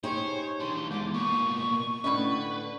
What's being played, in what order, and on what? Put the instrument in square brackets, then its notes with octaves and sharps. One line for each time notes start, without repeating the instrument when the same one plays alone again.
[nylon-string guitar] D#4 G4 G#4 [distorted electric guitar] C5 [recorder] C#5
[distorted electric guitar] E3 D4 [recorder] C6
[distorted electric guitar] E2 [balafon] G#3 [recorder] D6
[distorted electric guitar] A#2 B3 [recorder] C#6
[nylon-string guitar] A2 D3 D#5 [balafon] C#4 B5 [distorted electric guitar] B4